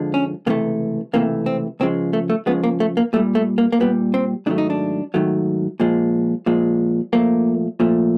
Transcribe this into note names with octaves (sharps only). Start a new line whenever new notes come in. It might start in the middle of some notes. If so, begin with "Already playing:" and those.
Already playing: F2 D3 F3 G#3
C#4
C#2 C3 E3 A3 A#3
C#2 C3 E3 A3 A#3
C4
C#2 C#3 F3 G#3 C4
A3
A3
C#2 C#3 F3 G#3 B3
A#3
A3
A#3
A#2 G3 A3
A3
A#3
A#3
A#2 G3 B3
C4
G#2 D#3 F#3 A3 D4
D#4
D4
G#2 D#3 F#3 A3
A#2 F3 G#3
A#2 F3 G#3
A#2 F3 A3 A#3
A#2 F3 A3